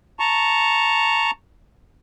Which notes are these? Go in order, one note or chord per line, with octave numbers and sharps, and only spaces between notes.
A5 A#5 C#6